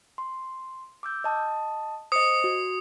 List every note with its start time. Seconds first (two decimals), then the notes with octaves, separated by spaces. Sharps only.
0.18 C6
1.03 D6 E6 G6
1.24 D#5 A5 D#6
2.12 C5 D#5 D#6 C#7
2.44 F#4